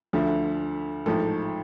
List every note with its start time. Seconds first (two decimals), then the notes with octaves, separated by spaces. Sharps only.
0.13 D2 D3 F3
1.06 A1 G#2 F3 A4